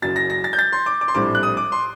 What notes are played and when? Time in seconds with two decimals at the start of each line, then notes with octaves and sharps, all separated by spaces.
0.02 F#1 F#2 F#3 A6
0.16 A#6
0.30 A#6
0.44 A6
0.53 G6
0.59 A6
0.72 C6
0.86 D6
1.01 D6
1.08 C6
1.15 A#1 A2 G3 C4 D6
1.35 F#6
1.43 D#6
1.57 D6
1.72 C6